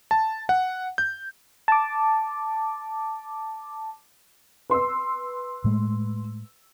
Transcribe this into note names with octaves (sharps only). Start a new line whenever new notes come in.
A5
F#5
G6
A5 D6
B4 C6 E6
A2 G#3 A3